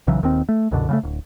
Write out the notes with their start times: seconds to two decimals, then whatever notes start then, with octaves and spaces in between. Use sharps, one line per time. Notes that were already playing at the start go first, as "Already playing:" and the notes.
0.07 B1 C#3 E3 F#3
0.22 D#1 D#2 D#3 C4
0.49 A3
0.71 C2 F#2 B2 D3
0.89 C#3 F#3 A3
1.03 D1